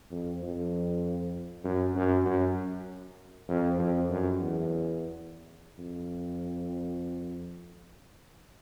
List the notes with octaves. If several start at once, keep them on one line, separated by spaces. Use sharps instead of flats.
F2
F2
F#2
F#2
F#2
F2
F2
F#2
E2
F2